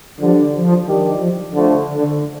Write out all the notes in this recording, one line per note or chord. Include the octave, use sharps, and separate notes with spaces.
D3 F3 G3 D4
F3
D#3 G3 D4 G4
F3
D3 F3 A3
D3